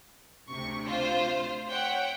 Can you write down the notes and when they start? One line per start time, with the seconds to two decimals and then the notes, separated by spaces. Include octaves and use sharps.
0.50 D2 C3 C#6
0.85 F4 C5
1.70 C#5 E5 F#5 G5